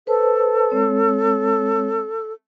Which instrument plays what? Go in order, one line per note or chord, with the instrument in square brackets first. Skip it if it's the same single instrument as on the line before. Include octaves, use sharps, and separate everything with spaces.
[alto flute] A4 [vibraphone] B4 C5 A5
[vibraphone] G#3 C4 C#5